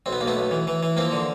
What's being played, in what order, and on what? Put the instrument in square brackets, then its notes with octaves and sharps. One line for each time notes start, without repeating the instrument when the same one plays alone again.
[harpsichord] B1 C4
B3
B1 A#3
A3 B3
B1
E3
E3
E3
F3 A#3 C4
D3